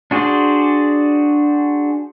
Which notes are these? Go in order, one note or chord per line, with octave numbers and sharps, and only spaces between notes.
D4 F#4 G#4 C5 D5